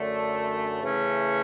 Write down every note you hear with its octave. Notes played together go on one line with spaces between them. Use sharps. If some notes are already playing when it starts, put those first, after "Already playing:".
Already playing: F#2 D3 A3
C#3 E3 A3 C#4